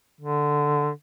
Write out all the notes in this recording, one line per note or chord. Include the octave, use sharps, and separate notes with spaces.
D3